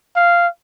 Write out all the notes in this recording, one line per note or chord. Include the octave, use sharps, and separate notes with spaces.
F5